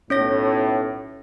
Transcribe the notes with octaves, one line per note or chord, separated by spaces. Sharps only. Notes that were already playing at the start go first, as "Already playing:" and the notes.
B1 A2 C#4 C#5 A#6